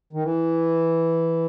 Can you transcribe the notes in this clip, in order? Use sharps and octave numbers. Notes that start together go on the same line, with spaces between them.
D#3
E3